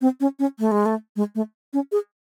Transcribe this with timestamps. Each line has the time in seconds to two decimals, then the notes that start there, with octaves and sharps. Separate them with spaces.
0.01 C4
0.20 C#4
0.39 C#4
0.59 A3
0.71 G#3
0.86 A3
1.16 G#3
1.35 A3
1.73 C#4
1.92 G#4